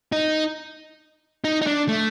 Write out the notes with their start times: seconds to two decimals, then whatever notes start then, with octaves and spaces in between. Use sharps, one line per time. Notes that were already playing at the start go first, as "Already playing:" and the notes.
0.12 D#4
1.44 D#4
1.62 D#4
1.67 D4
1.88 A3